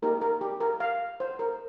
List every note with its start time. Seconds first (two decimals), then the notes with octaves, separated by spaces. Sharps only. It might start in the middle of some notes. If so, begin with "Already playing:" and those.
0.02 A#3 D#4 G4 A#4
0.21 A#4
0.41 G4
0.60 A#4
0.80 F5
1.20 C5
1.39 A#4